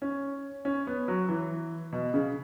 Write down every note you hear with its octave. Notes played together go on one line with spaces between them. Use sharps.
C#4
C#4
B3
F#3
E3
B2
C#3